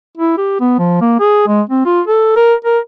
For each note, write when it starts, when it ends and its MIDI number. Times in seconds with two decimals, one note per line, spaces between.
0.18 0.37 64
0.38 0.60 67
0.60 0.74 59
0.79 1.00 53
1.01 1.20 58
1.20 1.45 68
1.47 1.61 56
1.70 1.85 60
1.85 2.01 65
2.08 2.34 69
2.36 2.54 70
2.65 2.79 70